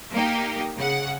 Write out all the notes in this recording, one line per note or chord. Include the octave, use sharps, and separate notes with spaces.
A#3 D#4 G4
C#3 F#5